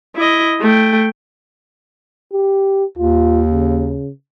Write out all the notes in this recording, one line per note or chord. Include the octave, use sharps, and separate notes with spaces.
E4 D#5
A3 G5
G4
D#2 F4
C#3